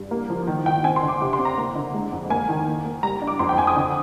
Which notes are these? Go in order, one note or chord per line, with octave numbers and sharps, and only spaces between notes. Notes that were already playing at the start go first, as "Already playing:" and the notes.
Already playing: G2
A#3
F3
D#3
D#3 G5
C4 G#5
C6
D3
D6
C3 D6
C6
C4
A#5
A#3
D3
G#3
F2
A#3 G#5
D#3
A#3
A#3
G3 A#5
D4
D6
F2 C6
G5
F2 G#5
D#6
D3